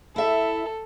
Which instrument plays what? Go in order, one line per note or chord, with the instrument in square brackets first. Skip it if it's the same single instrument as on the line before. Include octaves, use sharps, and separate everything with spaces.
[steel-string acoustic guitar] E4 E5 [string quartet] A4